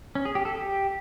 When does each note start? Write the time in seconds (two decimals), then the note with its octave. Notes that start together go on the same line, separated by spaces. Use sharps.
0.15 C#4
0.25 G#4
0.35 G4
0.45 A4
0.55 G4